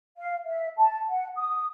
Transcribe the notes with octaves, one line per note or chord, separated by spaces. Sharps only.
F5
E5
A5
F#5
D#6